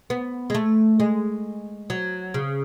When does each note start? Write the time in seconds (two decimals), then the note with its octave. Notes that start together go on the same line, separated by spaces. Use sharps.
0.10 B3
0.50 G#3
0.55 A3
1.00 G#3
1.90 F#3
2.34 C#3